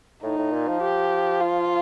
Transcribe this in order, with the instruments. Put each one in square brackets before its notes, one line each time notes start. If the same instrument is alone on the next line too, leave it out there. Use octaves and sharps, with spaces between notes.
[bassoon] A2 [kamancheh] D#4
[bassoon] A2
A#2
F3
[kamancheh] G4
F4